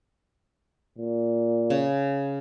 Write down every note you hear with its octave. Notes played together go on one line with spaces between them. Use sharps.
A#2
C#3